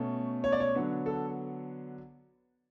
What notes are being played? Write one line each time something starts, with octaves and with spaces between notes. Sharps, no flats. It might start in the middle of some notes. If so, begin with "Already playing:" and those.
Already playing: B2 A3 C#4
C#5
D5
C#5
D3 F#3 B3 D4
A4